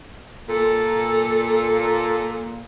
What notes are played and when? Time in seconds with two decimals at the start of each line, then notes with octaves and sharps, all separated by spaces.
0.48 A#2 A4